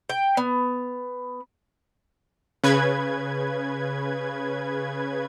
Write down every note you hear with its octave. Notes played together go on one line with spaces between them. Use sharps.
G5
B3
C#3 B4 G#6